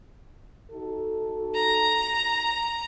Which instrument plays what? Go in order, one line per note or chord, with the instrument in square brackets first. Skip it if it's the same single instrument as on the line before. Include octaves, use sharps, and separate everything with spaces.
[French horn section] D#4 F#4 A4
[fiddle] A#5